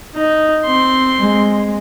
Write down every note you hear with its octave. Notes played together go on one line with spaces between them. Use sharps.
D#4
C4 C6
G#3